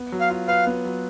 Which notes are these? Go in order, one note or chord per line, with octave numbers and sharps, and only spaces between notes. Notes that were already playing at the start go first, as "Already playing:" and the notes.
Already playing: B3
F#3
F5
F4
B4 F5
B3
F#3